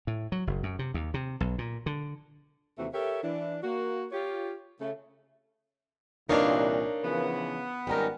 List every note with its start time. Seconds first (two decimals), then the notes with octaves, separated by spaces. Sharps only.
0.07 A2
0.32 F#3
0.47 F#1
0.63 F#2
0.79 C3
0.94 D#2
1.14 C3
1.41 B1
1.58 A#2
1.86 D3
2.78 D#2 C3 E3 A3 C4 F#4
2.93 G4 A4 A#4 C#5 E5
3.22 E3 D4
3.63 A#3 F#4
4.12 F4 G4 C#5
4.81 C#3 A3 C#4
6.29 C2 A#2 E3 D4 D#4 A#4 C#5 F5
7.04 C#3 E3 F3 B3
7.87 G#1 G3 C#4 D#4 A#4